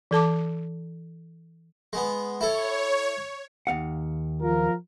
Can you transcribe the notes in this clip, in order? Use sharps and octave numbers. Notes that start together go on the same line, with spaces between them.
E3 A4 A5 D6
G#3 B3
E4 A4 C#5
D#2 F5 F#5
F3 F4 A#4